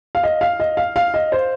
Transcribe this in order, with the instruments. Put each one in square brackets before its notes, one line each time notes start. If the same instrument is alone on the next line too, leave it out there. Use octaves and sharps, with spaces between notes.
[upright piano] F5
D#5
F5
D#5
F5
F5
D#5
C5